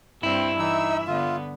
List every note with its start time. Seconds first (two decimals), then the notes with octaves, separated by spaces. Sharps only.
0.23 G2 C4 E4 E6
0.59 E3 D#4 E5 E6
1.07 D3 B3 F4